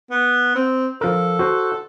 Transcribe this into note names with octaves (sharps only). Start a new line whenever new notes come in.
B3
C4
F3 A4 A#4
F#4 C5